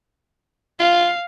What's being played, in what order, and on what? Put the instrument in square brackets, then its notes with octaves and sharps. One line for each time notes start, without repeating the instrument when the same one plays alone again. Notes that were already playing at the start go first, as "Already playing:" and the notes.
[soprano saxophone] F4 [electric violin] F5